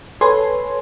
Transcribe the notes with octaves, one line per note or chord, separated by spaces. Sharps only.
A4 B4 C#5 G#5 C6